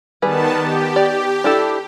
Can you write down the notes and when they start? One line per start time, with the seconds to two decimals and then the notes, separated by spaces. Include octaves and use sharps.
0.22 D#3 G3 B3 G#4 B4 A5
0.57 G4
0.96 D5
1.44 D4 E4 A4